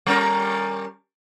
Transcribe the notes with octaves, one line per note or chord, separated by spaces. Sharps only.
G3 C#4 A#4